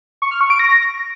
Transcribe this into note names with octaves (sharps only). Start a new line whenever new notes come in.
C#6
F6
C#6
D7
A#6